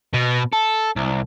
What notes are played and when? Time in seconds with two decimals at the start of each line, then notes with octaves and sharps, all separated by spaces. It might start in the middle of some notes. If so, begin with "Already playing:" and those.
0.14 B2
0.53 A4
0.96 C2